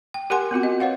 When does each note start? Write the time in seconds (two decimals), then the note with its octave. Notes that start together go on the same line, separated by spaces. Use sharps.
0.14 G5
0.30 G4 A#4 F#5 G#5 C6
0.51 B3 C4 F4 F#4
0.63 D#5
0.80 B4 C#5 F5 F#5